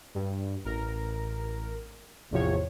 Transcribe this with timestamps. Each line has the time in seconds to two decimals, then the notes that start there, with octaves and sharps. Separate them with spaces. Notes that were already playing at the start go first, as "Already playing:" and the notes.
0.14 G2
0.64 A1 A#4
2.30 A1 E2 C3 F3 C#5